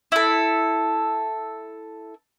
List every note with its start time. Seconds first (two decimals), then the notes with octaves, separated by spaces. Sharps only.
0.12 E4 A4